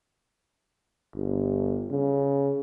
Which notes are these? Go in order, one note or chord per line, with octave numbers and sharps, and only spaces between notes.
G1
C#3